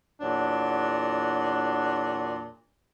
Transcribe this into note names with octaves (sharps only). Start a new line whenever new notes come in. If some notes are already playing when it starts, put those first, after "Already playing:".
E2 A#2 F#3 D4